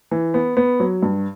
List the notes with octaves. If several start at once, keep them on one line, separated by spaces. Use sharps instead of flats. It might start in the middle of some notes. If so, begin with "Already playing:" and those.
E3
B3
B3
F#3
G2